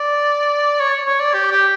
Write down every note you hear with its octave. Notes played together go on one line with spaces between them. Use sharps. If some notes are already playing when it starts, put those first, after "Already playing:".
Already playing: D5
C#5
C#5
D5
G4
G4